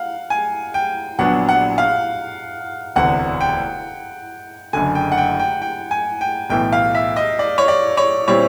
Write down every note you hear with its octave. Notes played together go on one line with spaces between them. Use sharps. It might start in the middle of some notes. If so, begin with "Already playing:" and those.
Already playing: F5 F#5
G#5
G5
A#1 A#2 F#3 B3 D4 F#5
F#5
F5
E1 D2 C3 E3 F#5
G5
F#1 F#2 D3 G#5
G5
F#5
G5
G5
G5
G#5
G5
B1 A2 E3 G5
F5
E5
D#5
D5
C#5
D5
C#5
A#2 G3 C4 E4 C#5